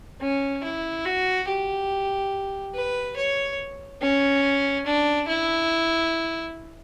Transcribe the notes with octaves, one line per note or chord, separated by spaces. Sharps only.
C#4
E4
F#4
G4
B4
C#5
C#4
D4
E4